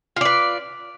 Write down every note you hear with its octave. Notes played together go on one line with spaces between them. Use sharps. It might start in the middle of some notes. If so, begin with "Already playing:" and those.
F4 B4 D5